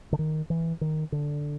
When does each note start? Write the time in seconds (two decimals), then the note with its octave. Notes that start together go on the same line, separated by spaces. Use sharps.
0.13 D3
0.19 D#3
0.50 E3
0.81 D#3
1.12 D3